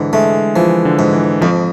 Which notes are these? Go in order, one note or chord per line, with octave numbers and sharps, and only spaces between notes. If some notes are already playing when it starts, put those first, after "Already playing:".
Already playing: G#2 D3 E3
G#3 A3
E3 F3
D3
G#2
E3
F2 F3